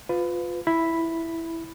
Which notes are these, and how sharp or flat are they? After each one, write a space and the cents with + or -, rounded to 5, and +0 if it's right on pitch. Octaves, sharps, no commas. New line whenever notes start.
F4 +15 B4 +20
E4 +0 B5 +0